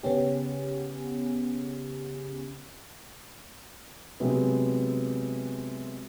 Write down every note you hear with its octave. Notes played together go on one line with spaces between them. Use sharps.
C#3 B3 C#4 G4
C3 F#3 G#3 B3 G4